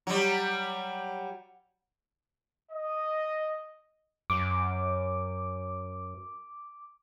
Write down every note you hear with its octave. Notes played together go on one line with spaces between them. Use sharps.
F#3 G3
D#5
F#2 D6